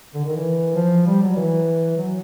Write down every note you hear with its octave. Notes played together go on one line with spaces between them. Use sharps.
D3
D#3
E3
F3
G3
F#3
E3
F#3